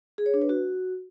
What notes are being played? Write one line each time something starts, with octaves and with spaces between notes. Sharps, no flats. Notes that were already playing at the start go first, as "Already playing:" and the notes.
G#4
C#5
D4
B4
F#4